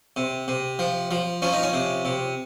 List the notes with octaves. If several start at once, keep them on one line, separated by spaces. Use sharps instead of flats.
C3
C3
F3
F3
F3 C#4
D#4
C#4
C3
C3